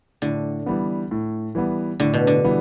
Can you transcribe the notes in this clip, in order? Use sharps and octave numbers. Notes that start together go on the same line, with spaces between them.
A2 D3
E3 G3 B3
A2
E3 G3 B3
A2 D3
B2
D3
E3 G3 B3